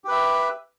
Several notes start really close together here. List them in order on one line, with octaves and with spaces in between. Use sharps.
G4 B4 E5